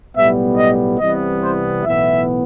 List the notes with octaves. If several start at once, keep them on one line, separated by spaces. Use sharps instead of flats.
B1 A2 G3 B3 E5
D#5
C2 C3 E3 G3 B3 D#5
C5
B1 A2 E3 B3 E5